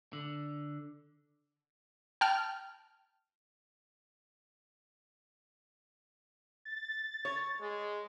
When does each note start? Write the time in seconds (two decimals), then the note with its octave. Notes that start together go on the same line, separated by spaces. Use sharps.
0.13 D3
2.21 G5 A5 F6
6.65 A6
7.25 C#5
7.61 G#3